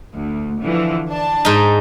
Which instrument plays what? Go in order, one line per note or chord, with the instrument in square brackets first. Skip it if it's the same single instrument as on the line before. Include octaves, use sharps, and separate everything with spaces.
[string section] D2
D3 E3 F3
D4 A5
[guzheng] G#2 D#4